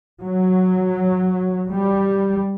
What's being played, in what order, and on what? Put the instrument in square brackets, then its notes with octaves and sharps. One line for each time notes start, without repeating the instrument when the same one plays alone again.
[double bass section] F#3
G3